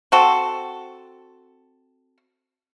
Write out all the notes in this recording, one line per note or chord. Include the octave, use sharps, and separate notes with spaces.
C4 F#4 A4